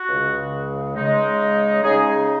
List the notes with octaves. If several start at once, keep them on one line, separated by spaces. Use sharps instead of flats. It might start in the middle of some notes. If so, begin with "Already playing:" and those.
Already playing: F#4
C#2 C#3 G#3
C#3 G#3 D#4
C#3 G#3 D#4 G#4